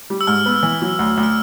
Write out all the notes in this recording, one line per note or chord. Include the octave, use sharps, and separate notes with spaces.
G3
E6
G#2 F6
B3
E3
F#3
D2
D2
F6